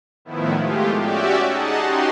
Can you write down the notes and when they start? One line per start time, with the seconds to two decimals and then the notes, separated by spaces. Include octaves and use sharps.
0.25 A2 D#3 F3 B3 E4
0.57 G#3 A3 F4 G4
0.99 C#4 F#4 G4 D5 E5
1.47 D#4 G#4 D#5 F#5 A5
1.80 C#4 D#4 F#4 G4 C6